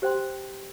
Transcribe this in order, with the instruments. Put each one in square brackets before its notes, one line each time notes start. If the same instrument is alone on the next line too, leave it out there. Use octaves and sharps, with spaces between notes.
[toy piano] G4 C5 G5 C6